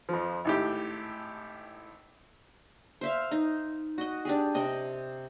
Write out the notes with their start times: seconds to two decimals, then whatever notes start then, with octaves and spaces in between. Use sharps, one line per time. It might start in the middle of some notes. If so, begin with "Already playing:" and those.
0.09 F2 F3
0.45 G#1 A2 G4
3.01 C5 E5 F5
3.31 D#4
3.98 F#4 D#5
4.25 D4 G4 G#4
4.54 C3 D#5 G5